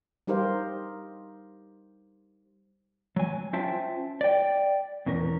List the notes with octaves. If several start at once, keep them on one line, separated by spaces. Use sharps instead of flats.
G3 D#4 G4 A#4 C5 F5
F#3 G#5
C#4 F4 C5 E5 G5 A5
D5 G5
E2 B2 C#4 A#4